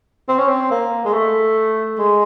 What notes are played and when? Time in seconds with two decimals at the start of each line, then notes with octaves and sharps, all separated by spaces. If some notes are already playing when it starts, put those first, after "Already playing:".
0.28 C4
0.38 C#4
0.48 C4
0.71 A#3
1.05 G#3
1.13 A3
1.99 G#3